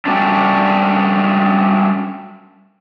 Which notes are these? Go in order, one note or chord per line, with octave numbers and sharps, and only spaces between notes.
F#3 G3 A3 C#4 D4